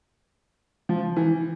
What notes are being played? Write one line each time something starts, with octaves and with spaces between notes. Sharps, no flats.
F3
E3